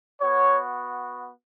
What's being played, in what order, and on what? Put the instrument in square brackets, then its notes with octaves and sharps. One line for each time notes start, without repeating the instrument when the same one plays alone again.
[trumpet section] B3 F#4 C#5